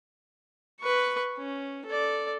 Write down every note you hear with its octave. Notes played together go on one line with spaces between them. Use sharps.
B4 C#6
C#4
A4 D5